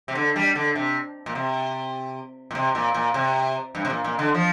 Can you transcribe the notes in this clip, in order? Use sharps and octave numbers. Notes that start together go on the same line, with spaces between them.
C3
D3
G3
D3
C3
A#2
C3
A#2
C3
A#2
A#2
C3
G2
C3
A#2
A#2
D3
F3